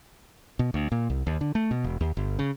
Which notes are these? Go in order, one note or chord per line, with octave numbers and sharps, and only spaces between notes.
B2
D2
A#2
C2
D#2
D3
A3
B2
E1
D#2
G1
C#3